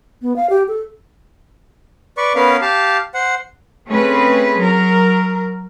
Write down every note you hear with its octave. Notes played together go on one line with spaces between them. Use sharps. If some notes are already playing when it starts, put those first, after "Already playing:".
B3
F5
G4
A4
B4 D5 C#6
B3 C#4 A#4 B4 F5
G4 F5 A5
C5 F#5
A3 C4 C#4 G#4 B4
F#3 A#4